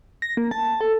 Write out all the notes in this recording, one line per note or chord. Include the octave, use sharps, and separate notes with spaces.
A#6
A#3
A5
A5
A4